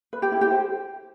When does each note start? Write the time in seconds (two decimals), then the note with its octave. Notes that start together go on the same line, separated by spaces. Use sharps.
0.13 B4
0.22 G4
0.32 E4
0.41 G4
0.51 C5